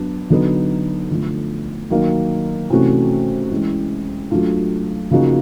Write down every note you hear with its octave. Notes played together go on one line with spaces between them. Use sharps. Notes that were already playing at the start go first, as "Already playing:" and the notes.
Already playing: F#3 B3 D4
D3 F#3 B3 D#4
D3 F3 A3
D#3 F#3 A#3 D#4
C3 E3 A3 C#4 F#4
E3 G#3 C#4 E4
F#3 A3 D4 F4
C#3 F3 A#3 D#4 F#4